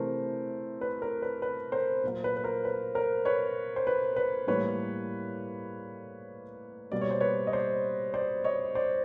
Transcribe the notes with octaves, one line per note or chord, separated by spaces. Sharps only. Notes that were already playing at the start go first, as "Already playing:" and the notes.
Already playing: C3 E3 A3 A#4 C5
B4
A#4
B4
B4
A#4 C5
A#2 F#3 A#3
B4
B4
A#4 C5
B4
A#4 C5
B4 C#5
C5
B4
B4
A2 E3 G3 A#3 B4 C#5
B2 G3 A#3 D5
C#5
C5
B4 C#5
D#5
C5 D5
C5 D5
C#5 D#5
C5 D5